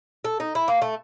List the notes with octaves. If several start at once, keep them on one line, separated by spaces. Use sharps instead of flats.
A4
D#4
E4
A#3
A3